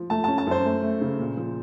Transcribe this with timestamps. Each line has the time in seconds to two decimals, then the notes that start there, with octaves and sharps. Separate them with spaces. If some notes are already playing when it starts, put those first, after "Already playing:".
Already playing: F3
0.10 A3 A5
0.24 C#4 A5
0.38 A5
0.47 F#2 C5
0.65 A3
0.83 A3
1.01 C#3
1.19 A#2
1.37 F3